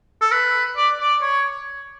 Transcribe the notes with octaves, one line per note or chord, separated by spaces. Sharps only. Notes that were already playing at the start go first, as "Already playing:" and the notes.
A4
B4
D5
D5
C#5